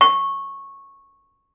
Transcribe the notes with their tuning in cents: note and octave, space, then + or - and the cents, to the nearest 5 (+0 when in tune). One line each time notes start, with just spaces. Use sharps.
C#6 -15